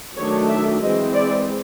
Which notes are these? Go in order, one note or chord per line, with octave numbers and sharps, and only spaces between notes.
D#3 F#3 A3 D4 C#5
E5
E3 G#3 C4 D#5
D5